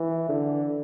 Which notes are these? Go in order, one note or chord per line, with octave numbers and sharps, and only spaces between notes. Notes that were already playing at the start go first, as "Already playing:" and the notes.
Already playing: E3
D3